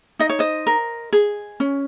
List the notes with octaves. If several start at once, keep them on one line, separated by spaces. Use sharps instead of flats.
D#4 D#5
C#5
C5 D#5
A#4
G#4
C#4